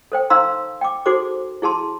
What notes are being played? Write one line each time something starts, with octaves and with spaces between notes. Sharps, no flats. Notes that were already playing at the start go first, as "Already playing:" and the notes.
A4 C5 G5
D#4 C5 F5 A#5 C6 E6
G5 D6
D#4 F#4 G#4 A4 C5 D6
E4 G#4 A5 C6